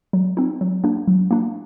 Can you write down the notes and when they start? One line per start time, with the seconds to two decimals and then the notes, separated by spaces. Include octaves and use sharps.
0.13 F#3
0.37 C4 D#4
0.61 F#3
0.84 A#3 D4
1.08 F#3
1.31 A#3 D4